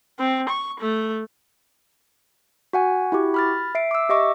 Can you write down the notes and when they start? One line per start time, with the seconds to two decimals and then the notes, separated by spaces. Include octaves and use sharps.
0.19 C4
0.49 C#6
0.80 A3
2.73 F#4 F#5 G#5
3.12 E4 F#4 G4
3.34 B5 F6 A6
3.75 E5 C7 D7
3.91 D6 E6
4.09 G4 D#5 E5 C#6 D6